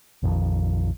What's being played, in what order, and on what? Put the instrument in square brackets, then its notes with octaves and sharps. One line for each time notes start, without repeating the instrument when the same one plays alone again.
[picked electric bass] A#1 F2 D#3 F3